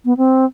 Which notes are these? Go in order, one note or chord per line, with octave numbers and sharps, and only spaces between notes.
B3
C4